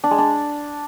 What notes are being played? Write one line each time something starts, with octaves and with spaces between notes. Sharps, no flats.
D4
G#3
D4